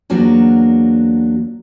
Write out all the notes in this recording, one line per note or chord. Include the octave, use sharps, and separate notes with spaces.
E2 F#3 A#3 D4 F#4